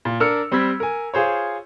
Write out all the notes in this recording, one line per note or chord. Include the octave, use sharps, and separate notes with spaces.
A#2
D4 A#4 E6 F6 C#7
G3 C4 B5 E6 G#6 B6
A#4 G#5
F4 G#4 C5 C#5